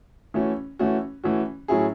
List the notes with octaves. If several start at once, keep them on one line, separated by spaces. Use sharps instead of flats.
E3 A3 C#4 F#4
E3 A3 C#4 F#4
E3 A3 C#4 F#4
A2 F#3 C#4 E4 G#4